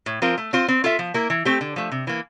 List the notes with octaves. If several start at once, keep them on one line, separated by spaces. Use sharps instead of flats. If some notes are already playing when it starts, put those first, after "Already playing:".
A2
F3 C4 F4 A#4
A3
C4 F4 C5
C4
F4 A4 E5
F3
A#3 E4 A#4
E3
A3 C4 G4
D3
F3 A3
C3
E3 A#3